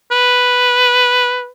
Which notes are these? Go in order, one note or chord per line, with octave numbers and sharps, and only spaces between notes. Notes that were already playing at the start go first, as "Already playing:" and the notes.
B4